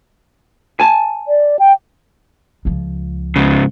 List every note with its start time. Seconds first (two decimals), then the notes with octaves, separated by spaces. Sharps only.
0.80 G#5 A5
1.28 D5
1.59 G5
2.65 C#2 F3
3.36 G#2 C#3